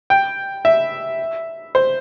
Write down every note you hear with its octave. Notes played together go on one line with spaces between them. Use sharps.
G5
E5
C5